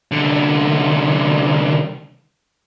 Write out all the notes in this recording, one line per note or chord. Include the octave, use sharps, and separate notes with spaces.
C2 D3